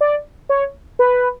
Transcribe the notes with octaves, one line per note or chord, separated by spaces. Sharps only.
D5
C#5
B4